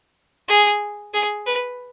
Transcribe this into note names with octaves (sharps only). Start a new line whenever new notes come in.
G#4
G#4
B4